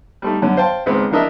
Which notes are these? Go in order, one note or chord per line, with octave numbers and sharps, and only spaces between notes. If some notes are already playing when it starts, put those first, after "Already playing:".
G3 A3 D#4
F#2 D3 C#4
C5 F5 G5 A5
G#1 C#2 B3 C4
A#1 E3 D4 A#4 D#5 E5